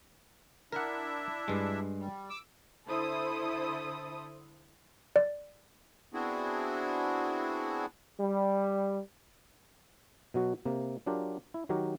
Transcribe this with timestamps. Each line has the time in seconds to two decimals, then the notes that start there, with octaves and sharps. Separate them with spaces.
0.72 D4 E4 A#4 E5 F#5
1.48 G2 G#3
2.00 G3
2.30 D6 E6
2.89 D3 E4 A4 C5 D#6
5.16 D5
6.14 B3 C4 D4 E4 F#4 G#4
8.20 G3
10.34 B2 F#3 F#4
10.65 C3 A#3
11.06 F#3 D4 F4 G4 A#4
11.54 E4
11.69 D#3 F#3 F#4 G4 A#4